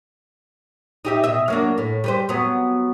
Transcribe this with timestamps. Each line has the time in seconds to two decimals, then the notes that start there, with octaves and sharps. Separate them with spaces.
1.05 D#4 G4 E5
1.24 B2 D#5 E5
1.48 F#3 A#3 D4
1.78 A2
2.04 G3 B4 C5
2.29 F#3 B3